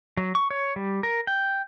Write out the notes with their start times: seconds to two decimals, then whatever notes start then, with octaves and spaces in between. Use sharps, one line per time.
0.17 F#3
0.35 C#6
0.51 C#5
0.76 G3
1.03 A#4
1.27 G5